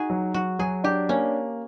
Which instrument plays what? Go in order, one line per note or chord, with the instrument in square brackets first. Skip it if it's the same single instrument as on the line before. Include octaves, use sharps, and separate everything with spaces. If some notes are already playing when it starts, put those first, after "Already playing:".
Already playing: [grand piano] D#4 [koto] F#4 G#4
[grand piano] F#3
[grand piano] F#3 [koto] F#4
[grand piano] F#3 [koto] G#4
[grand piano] D4 [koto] G4
[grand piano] A#3 [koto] C#4